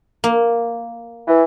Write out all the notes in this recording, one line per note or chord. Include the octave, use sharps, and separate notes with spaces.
A#3
E3